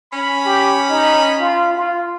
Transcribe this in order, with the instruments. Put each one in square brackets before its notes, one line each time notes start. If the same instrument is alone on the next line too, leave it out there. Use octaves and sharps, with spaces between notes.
[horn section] C#4 B5
[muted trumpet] G4
D#4
F4
F4